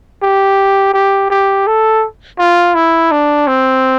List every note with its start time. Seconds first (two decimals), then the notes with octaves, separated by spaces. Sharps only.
0.23 G4
0.94 G4
1.30 G4
1.67 A4
2.39 F4
2.75 E4
3.11 D4
3.47 C4